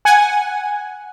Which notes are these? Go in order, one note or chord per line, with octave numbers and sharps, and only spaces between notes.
F#5 G#5